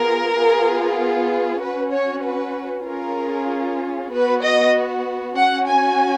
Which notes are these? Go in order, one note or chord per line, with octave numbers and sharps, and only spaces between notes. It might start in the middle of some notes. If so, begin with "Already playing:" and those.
Already playing: B3 F4 G#4 A#4
B3 F4 G#4
C#4 F#4 B4
C#5
B4
C#4 F4 G#4 A#4
B3 F#4 B4
D#5
C#4 F#4 F#5
G#5